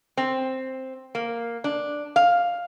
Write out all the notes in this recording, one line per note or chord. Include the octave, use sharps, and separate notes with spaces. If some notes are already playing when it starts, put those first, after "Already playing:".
C4
A#3
D4
F5